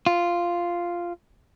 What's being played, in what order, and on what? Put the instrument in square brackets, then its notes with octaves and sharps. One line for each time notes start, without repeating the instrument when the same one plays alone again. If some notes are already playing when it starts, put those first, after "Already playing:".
[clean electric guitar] F4